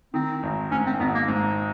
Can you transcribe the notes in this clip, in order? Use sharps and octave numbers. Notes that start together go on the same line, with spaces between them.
D#3 C4
G#1
G#2 C#4
C4
G#1 B3
A#3
G#2